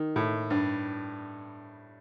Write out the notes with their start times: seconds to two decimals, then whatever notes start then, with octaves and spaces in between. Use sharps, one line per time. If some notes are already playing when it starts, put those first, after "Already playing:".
Already playing: D#3
0.16 A2
0.50 G2